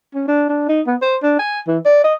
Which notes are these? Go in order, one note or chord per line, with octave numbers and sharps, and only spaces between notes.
C#4
D4
D4
D#4
B3
C5
D4
G#5
E3
D5
D#5